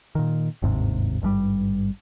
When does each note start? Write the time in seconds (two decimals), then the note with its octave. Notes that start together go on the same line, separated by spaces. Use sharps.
0.15 A#2 D#3
0.62 G1 D#2 G#2 C3
1.22 G#1 G2 C3 G3